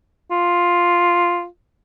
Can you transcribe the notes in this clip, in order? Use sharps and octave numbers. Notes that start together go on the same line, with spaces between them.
F4